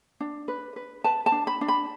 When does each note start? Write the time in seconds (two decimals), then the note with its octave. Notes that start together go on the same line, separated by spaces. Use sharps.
0.20 D4
0.48 B4
0.76 B4
1.04 B4 A5
1.26 A5
1.32 D4
1.47 B5
1.61 D4
1.68 B5